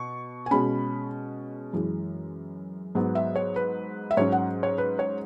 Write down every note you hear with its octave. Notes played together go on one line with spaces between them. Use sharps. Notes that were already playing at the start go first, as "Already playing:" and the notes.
Already playing: B2 C#6
G#5
B2 G#3 C#4 B5
F#2 E3 G#3
G#2 F#3 B3
E5
C#5
B4
E5
G#2 F#3 C#4 C#5
F#5
C#5
B4
C#5